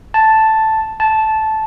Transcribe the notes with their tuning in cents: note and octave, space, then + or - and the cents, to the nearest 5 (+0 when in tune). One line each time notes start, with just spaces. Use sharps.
A5 +0
A5 -10